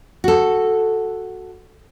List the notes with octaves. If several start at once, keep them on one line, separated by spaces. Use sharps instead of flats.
F#4 A4